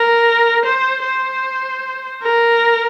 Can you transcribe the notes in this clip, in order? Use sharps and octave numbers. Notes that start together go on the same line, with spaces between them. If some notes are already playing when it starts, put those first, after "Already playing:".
Already playing: A#4
C5
C5
A#4